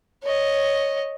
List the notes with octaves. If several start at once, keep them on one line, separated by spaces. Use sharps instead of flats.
C#5 D#5